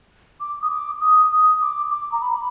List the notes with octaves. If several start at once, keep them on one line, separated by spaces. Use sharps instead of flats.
D6
D#6
D6
D#6
D#6
D6
D6
A#5
B5